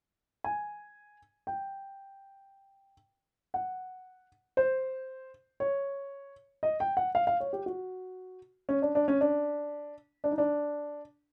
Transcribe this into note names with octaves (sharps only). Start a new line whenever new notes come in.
G#5
G5
F#5
C5
C#5
D#5
G5
F#5
F5
F5
C#5
G4
F#4
C#4
D4
D4
C#4
D4
D4
D#4
D4